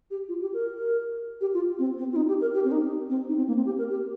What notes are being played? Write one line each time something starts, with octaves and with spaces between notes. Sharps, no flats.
G4
F4
G4
A#4
A#4
G4
F4
C4
C4
F4
D#4
G4
A#4
G4
C4
D#4
C4
D#4
C4
A#3
C4
G4
A#4
G4